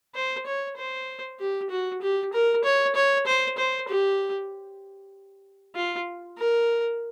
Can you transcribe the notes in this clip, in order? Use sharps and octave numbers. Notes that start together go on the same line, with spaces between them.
C5
C#5
C5
G4
F#4
G4
A#4
C#5
C#5
C5
C5
G4
F4
A#4